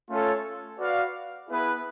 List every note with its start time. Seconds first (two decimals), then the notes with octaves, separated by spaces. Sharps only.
0.09 A3 C#4 F4 A4 C#5
0.79 F#4 B4 D5 F5
1.48 B3 E4 G#4 B4